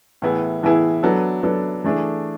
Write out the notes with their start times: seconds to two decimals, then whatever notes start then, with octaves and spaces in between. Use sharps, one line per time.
0.22 A2 E3 B3 E4 G#4
0.63 A2 E3 B3 E4 G#4
1.03 F#3 B3 D4 A4
1.43 F#3 B3 D4 A4
1.84 E3 A3 D4 G#4